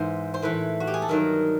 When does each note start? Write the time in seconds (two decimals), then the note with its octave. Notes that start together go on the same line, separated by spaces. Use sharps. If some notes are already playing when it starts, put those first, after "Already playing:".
Already playing: G#2 E3 C5
0.34 C5
0.42 A2 E3 B4
0.80 F#4
0.87 G4
0.94 G#4
1.02 A4
1.08 G2 D#3 F#3 A#4